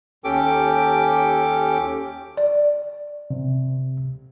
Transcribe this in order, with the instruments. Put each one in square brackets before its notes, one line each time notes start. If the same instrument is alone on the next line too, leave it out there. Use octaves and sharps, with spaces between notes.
[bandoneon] D#2 C#4 G4 A4 G5 D6
[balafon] D5
[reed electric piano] C3